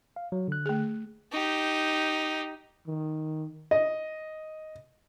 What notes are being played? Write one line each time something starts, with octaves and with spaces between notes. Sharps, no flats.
F5
F#3
D3 F#6
A3 G#4
D#4 G4
D#3
D#5